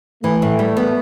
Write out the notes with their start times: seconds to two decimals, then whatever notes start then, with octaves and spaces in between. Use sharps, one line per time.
0.24 E3 A3
0.42 A2
0.59 G3
0.77 B3